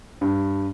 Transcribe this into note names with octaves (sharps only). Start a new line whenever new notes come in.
G2